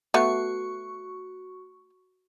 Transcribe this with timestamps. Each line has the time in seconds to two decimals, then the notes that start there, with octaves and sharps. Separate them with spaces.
0.14 A3 B3 F#4 C#6